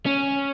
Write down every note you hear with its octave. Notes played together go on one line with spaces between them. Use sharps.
C#4